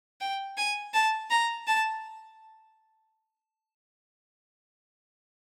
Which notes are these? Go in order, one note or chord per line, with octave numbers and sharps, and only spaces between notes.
G5
G#5
A5
A#5
A5